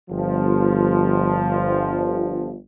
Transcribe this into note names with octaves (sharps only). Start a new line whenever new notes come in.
G1 F3